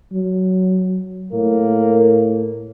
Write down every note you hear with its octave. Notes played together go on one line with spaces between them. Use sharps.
F#3
A2 A#3